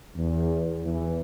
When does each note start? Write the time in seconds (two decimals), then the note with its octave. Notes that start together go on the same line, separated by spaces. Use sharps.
0.16 E2
0.84 E2 E3